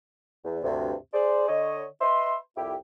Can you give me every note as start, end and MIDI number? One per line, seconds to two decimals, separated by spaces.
0.45 0.59 40
0.63 0.94 38
0.63 0.94 43
0.63 0.94 48
1.13 1.46 68
1.13 1.46 72
1.13 1.46 74
1.48 1.83 50
1.48 1.83 73
1.48 1.83 75
2.01 2.36 71
2.01 2.36 75
2.01 2.36 76
2.01 2.36 84
2.56 2.74 36
2.56 2.74 41
2.56 2.74 64
2.56 2.74 67